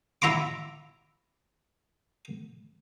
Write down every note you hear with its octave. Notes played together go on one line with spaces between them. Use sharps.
E4 E5 A#5 C6 D6